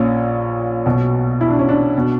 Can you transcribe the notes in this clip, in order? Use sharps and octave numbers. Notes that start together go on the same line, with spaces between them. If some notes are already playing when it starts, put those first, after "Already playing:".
Already playing: A#1 A#2 C#4
B1 B2
E4
D4
C#4
D4
B2